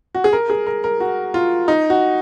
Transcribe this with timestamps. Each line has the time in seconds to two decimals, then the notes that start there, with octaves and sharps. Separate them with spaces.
0.15 F#4
0.24 G#4
0.33 A#4
0.50 G#4
0.67 A#4
0.84 A#4
1.00 F#4
1.34 F4
1.68 D#4
1.90 F#4